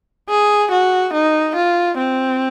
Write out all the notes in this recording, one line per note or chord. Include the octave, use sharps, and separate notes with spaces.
G#4
F#4
D#4
F4
C4